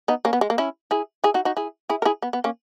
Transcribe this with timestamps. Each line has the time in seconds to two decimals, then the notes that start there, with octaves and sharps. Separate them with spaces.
0.08 B3 D#4
0.25 A#3 C#4
0.33 B3
0.41 G#3
0.50 A#3
0.58 C#4 E4
0.91 E4 G#4
1.24 E4 G#4
1.34 D#4 F#4
1.45 D#4 F#4
1.57 E4 G#4
1.89 E4 G#4
2.02 A#4
2.05 E4 G#4
2.22 B3
2.33 B3
2.44 A#3 C#4